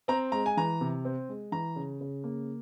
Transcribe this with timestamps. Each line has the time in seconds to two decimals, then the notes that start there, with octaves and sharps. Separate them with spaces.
0.08 C4 A#5
0.32 G#3 A#5
0.46 G#5
0.57 E3 A#5
0.81 C3
1.05 C4
1.29 G#3
1.52 E3 A#5
1.76 C#3
2.01 C#3
2.24 A#3